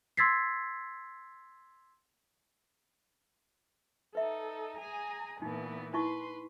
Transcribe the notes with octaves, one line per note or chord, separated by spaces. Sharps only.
C6 E6 G#6 A6 B6 C7
D#4 A4 B4 E5
G#4 G#5 A#5
A#2 E3 B3 D#4
D#4 E4 B4 C6 C#6